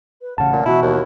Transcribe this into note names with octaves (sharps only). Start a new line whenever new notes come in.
B4
A1 C#3 F#5 A5
A#2
B2 E3 E4 F#4
D#2